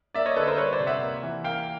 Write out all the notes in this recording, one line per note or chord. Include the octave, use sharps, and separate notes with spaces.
A#3 D5 E5
C#5 D#5
D3 A4 B4
A#4 C5
G3 B4 C#5
C5 D5
C3
E5 F#5
A#3
E3
A#3 F5 G5